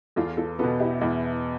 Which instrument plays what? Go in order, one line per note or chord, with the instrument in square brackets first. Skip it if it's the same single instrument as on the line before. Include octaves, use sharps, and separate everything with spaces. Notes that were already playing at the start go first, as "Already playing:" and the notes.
[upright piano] E2 [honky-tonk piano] F4 A4
[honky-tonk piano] F4 A4
[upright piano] B2 B3 [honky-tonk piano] F4 A4
[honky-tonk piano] E4 G4
[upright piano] E2 [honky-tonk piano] E4